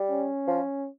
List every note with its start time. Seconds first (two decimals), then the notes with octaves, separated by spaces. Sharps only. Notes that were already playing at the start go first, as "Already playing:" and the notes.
Already playing: G3
0.10 C#4
0.47 F3